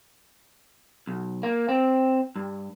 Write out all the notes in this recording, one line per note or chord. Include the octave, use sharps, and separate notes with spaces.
B1
A#3
C4
G2